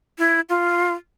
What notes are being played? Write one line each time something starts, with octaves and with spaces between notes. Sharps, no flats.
E4
F4